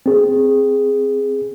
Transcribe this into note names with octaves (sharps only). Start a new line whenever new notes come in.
C4 G#4